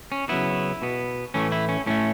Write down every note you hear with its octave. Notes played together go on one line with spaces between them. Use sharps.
C#4
C#3 F#3 B3 E4
B2 B3
A2 E3 A3 C#4
E4
C#4
A2 A3 C#4